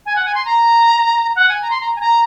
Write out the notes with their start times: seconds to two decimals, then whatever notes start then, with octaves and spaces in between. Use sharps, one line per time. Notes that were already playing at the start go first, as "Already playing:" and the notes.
0.06 G#5
0.16 F#5
0.25 G#5
0.35 C6
0.45 A#5
1.35 F#5
1.49 G#5
1.62 A#5
1.71 C6
1.81 A#5
1.96 G#5
2.01 A#5